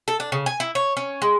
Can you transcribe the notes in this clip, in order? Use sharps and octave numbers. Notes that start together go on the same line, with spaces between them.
A4
D4
C#3
G#5
E4
C#5
C#4
G#3